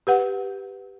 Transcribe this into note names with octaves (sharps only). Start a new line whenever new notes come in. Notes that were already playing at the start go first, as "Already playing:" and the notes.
G4 B4 F#5